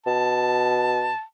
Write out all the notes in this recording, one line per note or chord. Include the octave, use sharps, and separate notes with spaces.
B2 A5